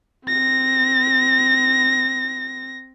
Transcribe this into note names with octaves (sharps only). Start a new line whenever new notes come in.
C4 A#6